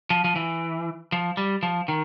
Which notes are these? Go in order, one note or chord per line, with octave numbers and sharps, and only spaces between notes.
F3
F3
E3
F3
G3
F3
D#3